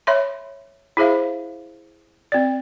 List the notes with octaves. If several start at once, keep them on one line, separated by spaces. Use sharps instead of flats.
C#5 E5 B5 C6
E4 G#4 C5 E5 F5
C4 D5